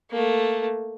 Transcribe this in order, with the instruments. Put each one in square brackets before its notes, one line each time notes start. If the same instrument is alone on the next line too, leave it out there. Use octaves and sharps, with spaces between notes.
[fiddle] A3 A#3